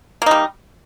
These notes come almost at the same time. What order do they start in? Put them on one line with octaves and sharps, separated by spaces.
A#3 D#4 G3